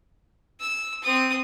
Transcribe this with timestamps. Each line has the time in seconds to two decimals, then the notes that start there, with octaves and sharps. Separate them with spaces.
0.59 E6
1.02 C4 D#6